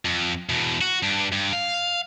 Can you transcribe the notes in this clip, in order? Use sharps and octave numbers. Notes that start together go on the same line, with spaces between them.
F2
E2 B2
F#4
G2 D4
G2
F5